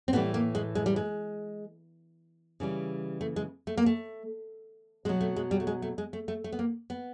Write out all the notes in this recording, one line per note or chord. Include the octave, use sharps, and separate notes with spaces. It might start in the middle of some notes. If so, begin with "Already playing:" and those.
C4
A2 E3 G3 B3
A#3
G#3
G#3
G3
G#3
C#3 E3 G3
A3
G#3
A3
A#3
A3
B2 F#3 G#3
A3
G#3
G3
A3
G#3
A3
G#3
A3
A3
A3
B3
A#3
B3